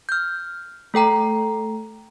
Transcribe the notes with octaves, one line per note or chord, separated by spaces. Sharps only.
F6 G6
A3 A4 G5 A#5